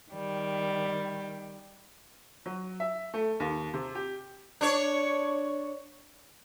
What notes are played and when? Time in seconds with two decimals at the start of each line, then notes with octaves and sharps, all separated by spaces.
0.11 D#3 G3
2.46 F#3
2.80 E5
3.14 A3
3.40 D#2
3.74 C3
3.95 G4
4.61 D4 C#5